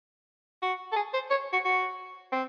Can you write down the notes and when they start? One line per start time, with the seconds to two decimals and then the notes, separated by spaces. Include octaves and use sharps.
0.62 F#4
0.92 A4
0.96 G#4
1.14 C5
1.31 C#5
1.53 F#4
1.65 F#4
2.32 C4